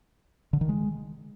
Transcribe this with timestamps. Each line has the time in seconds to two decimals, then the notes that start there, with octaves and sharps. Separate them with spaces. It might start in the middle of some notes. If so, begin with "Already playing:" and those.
0.53 D3
0.61 D#3
0.69 G#3